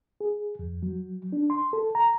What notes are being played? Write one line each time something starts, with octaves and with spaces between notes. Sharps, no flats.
G#4
F2
F#3
D4
C6
A4
A#5